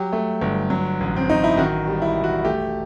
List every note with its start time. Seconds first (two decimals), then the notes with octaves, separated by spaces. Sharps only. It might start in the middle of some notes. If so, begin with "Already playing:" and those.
Already playing: F#3 G4
0.13 A3
0.41 G1
0.70 F#3
1.00 A1
1.16 C4
1.29 A1 D#4
1.44 E4
1.57 D#3 F#4
1.88 G3
2.02 E4
2.16 E1
2.24 F#4
2.44 A3 G4